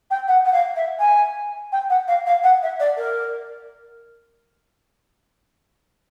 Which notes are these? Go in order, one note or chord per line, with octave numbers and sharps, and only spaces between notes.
G5
F#5
F#5
F5
E5
G#5
G5
F#5
F5
F5
F#5
E5
D5
A#4